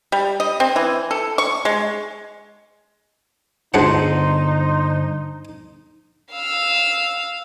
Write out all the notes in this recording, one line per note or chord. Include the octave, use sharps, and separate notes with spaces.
G3
D#5
C4
E3
A4
C#6
G#3
C#2 G2 D3 D4 D#4 C5 F#5 C6
F5 E6